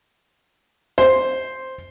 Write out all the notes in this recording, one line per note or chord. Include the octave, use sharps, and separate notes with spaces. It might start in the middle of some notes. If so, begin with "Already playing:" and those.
C5